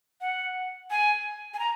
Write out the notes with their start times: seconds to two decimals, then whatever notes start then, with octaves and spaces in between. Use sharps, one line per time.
0.21 F#5
0.91 G#5
1.54 G#5
1.59 A#5